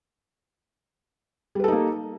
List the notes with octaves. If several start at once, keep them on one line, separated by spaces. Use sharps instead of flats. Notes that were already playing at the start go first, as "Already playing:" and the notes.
G3 A#3 D#4 A4 B4